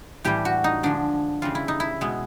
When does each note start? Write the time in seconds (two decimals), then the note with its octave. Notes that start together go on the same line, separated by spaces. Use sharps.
0.24 A2 E3 G3 G4
0.45 F#4
0.64 D#4
0.83 D3 F3 G#3 D4
1.42 C#3 E3 G3 F4
1.55 E4
1.68 D#4
1.80 E4
2.01 B2 G#3